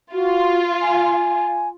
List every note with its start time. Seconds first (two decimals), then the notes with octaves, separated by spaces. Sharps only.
0.13 F4 F#4
0.82 G#5